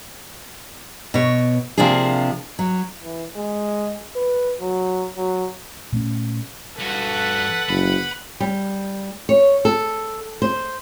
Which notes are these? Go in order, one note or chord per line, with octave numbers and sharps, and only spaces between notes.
B2 C#5
C3 F3 A#3 D4 G#4
F#3
E3
G#3
B4
F#3
F#3
A#2 A3 C#4
G2 F#4 A4 B4 F#5
F#1 B5
G3
C#5
A4
C5